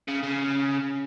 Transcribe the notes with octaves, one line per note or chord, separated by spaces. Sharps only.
C#3
C#3